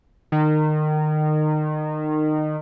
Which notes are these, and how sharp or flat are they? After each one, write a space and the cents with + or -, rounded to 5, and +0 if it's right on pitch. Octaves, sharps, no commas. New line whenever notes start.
D#3 -25